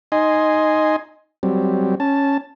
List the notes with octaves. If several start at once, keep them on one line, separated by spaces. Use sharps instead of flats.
D#4 D#5 G#5 C6
F#3 G3 C4
C#4 A5